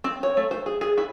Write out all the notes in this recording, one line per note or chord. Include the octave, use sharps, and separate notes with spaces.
C4
C#5
A3
C5
G#4
G#4
E4